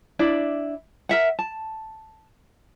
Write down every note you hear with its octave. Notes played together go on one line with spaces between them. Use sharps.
D4 E4 D5
A#4 E5 F#5
A5